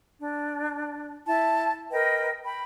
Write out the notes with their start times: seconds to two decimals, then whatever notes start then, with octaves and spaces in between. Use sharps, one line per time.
0.18 D4
1.26 E4 A5
1.91 A#4 B4 D#5 G5
2.44 G5 B5